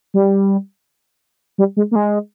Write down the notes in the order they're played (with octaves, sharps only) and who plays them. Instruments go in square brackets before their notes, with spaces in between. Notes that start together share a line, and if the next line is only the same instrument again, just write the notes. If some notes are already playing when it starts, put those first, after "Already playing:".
[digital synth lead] G3
G3
G#3
A#3
G#3